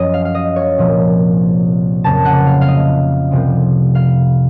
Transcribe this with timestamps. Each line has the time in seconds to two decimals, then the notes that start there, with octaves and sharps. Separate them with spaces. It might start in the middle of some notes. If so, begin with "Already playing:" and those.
Already playing: F#2 F3 C#5 D#5
0.14 F5
0.25 F5
0.35 D#5
0.56 C#5
0.78 C2 A#2 F3 A#3
2.04 F2 C#3 F#3 A#3 A5
2.25 F#5
2.46 F5
2.61 F5
2.68 D#5
3.31 C2 C3 F3 C4
3.95 F5